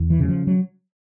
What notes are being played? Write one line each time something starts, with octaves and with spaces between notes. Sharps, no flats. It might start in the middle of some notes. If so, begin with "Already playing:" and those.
Already playing: E2
E3
C#3 F#3
F3
F#3